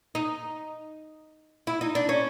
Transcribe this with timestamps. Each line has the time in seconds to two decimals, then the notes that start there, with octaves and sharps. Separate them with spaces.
0.15 D#4
1.67 E4
1.81 D#4
1.95 D4
2.09 C#4